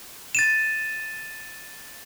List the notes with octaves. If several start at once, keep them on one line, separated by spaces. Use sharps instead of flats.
A6 D#7 E7